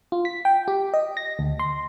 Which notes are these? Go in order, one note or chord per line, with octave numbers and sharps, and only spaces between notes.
F4
B6
G5
G4
D#5
A#6
D2
C6